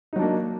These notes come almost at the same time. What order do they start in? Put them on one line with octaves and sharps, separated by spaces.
D#4 F#3 D4 A#3